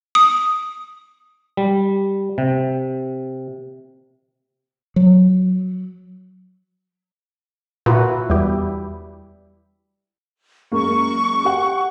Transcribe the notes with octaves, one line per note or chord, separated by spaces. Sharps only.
D#6
G3
C3
F#3
A#2 E4 F#4 B4
E2 G3 E4 G4
F#2 G#3 A#3 C#6
G4 F#5